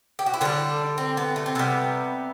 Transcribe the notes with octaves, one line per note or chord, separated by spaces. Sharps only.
G4
F#4
E4
D3 G3 D4
C4
B3
A3
C4
C3 G3 B3